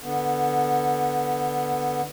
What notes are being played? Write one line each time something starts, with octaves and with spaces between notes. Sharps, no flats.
D3 B3